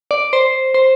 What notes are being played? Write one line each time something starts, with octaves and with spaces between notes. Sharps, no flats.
D5
C5
C5